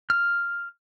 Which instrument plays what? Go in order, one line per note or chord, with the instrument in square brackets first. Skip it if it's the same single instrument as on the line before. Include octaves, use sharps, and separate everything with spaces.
[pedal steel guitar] F6